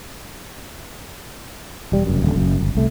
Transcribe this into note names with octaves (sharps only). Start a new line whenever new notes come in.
E1 G3
F1 F#2
D#1 D3
F#1 F#2
G1
C2 A3